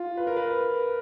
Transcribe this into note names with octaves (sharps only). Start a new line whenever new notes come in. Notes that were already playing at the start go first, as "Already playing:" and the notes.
Already playing: F4
B4
A#4
B4